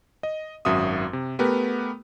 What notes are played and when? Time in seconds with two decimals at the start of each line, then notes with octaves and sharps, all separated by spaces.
0.23 D#5
0.65 G#1 F#2 F#4 E5 D#6
1.13 C3
1.39 A3 B3 G4 A#4 B4